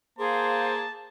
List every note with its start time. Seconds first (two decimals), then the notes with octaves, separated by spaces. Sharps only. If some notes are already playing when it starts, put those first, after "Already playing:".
0.19 A#3 G#4 C5 F5 A5 C6